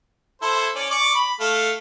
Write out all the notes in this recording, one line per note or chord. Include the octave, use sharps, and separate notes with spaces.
E4 A4 C5
C#4 D5
D5 C#6 D6
B5
A3 F5